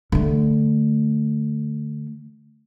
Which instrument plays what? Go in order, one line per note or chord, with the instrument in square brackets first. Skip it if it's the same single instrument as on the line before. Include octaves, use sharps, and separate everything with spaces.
[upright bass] D3 A3